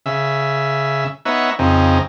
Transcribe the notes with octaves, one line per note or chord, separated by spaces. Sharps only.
C#3 E5
B3 D#4 C#5 E5 F#5
F2 C#3 C4 D#4